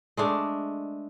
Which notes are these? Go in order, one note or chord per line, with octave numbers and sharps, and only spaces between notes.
G#3 A3 D4